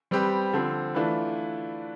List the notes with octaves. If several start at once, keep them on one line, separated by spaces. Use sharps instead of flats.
G3 C4 G4 B4
D3 F3 C4
E3 A3 D4 F4 B4